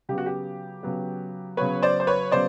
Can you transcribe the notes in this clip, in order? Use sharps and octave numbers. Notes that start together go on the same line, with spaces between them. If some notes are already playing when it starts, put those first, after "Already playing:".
C#3 F#3 B3 G4
F#4
G4
C#3 F#3 B3
C#3 F#3 B3 B4 C#5
C5 D5
C5
B4 C#5
C#3 F#3 B3 C5 D5